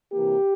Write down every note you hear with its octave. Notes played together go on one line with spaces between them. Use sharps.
C3 E3 A#3 G4